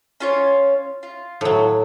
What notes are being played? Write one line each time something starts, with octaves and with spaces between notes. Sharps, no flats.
C#4 F4 C#5
F4
A2 F#3